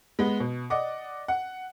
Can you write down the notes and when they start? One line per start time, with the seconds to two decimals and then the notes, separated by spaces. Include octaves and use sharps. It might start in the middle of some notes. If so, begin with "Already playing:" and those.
0.19 G#3 B3
0.40 B2
0.70 D5 D#5 F#5 D6
1.28 F#5